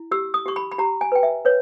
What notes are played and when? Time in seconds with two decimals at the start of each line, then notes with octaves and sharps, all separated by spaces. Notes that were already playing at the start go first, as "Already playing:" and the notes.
Already playing: E4
0.11 G4 E6
0.34 D#6
0.46 G4 C#6
0.56 B5
0.72 B5
0.78 G4 A#5
1.01 G#5
1.12 B4 G5
1.23 E5
1.45 B4 C#5